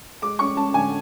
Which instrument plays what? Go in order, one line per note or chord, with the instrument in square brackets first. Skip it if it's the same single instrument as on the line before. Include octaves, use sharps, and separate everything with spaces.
[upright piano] G#3 D6
C#4 C#6
C#4 A5
D3 G#5